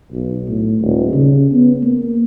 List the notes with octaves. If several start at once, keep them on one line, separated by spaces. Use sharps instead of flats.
B1
A2
D#1
C#3
B3
A#3